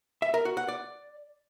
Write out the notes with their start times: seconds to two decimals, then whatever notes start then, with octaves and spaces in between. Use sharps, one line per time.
0.22 E5
0.34 A#4
0.45 F#4
0.57 F#5
0.68 D5